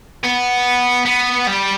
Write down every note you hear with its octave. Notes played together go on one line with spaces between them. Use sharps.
B3
B3
G3